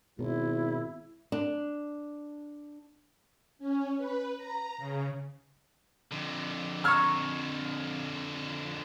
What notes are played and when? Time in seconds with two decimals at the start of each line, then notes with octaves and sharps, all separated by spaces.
0.19 G#1 B2 E4
1.32 D4
3.59 C#4
3.97 B4
4.37 A#5
4.78 C#3
6.11 F2 D3
6.84 A#5 C#6 E6 F6 G#6